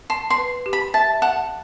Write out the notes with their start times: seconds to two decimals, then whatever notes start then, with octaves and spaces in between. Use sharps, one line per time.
0.10 A5 C6
0.30 C6
0.37 B4
0.66 G4
0.73 B5
0.94 E5 A5
1.22 F#5 A5